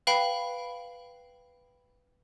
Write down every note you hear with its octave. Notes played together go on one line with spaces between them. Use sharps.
B4 F5 G5 B5